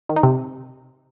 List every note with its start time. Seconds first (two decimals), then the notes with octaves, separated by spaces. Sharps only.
0.09 D#3
0.16 D#4
0.23 C3